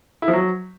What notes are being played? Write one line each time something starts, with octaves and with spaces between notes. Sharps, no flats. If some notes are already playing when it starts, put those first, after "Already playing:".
E4
F3
F#3